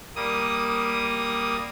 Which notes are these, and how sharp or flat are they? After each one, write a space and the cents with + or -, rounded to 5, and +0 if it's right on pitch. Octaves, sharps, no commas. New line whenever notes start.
G3 +0 A#3 +0 D#6 +0